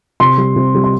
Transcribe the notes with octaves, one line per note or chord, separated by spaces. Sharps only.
C3 C6
G3
C3
G3
C6